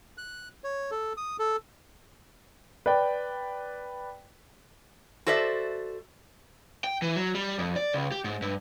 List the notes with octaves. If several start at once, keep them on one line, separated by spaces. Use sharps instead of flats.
F#6
C#5
A4
D#6
A4
B4 D5 G5
F#4 A4 C5 D5 E5
G5
E3
F#3
G3
F2
D5
C#2
G4
G#2
G2